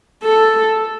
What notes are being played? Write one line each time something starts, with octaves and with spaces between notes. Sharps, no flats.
A4